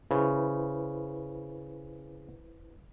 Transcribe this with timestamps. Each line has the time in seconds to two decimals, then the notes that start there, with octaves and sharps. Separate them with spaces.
0.11 C#3 E4 B4 C5